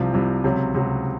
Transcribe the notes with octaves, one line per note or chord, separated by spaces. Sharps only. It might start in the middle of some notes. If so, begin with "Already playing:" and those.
Already playing: C2 C3 F3
C2 C3 F3
C#2 C3 F#3
C#2 C3 F#3